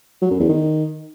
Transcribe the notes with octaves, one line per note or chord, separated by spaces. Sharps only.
F#3
F#2
E2
D#3